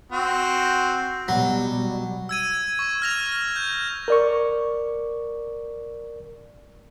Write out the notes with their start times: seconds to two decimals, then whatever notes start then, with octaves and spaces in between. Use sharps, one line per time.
0.12 C4 F#4
1.28 B2 F#3 G3
2.29 E6 G#6 D#7
2.79 C#6
3.02 F6 A#6 F7
3.56 G6
4.08 A#4 D5 C#6